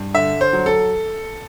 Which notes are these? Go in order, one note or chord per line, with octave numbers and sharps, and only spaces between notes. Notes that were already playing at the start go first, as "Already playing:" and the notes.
Already playing: G2
D3 E5
C5
F#3
A4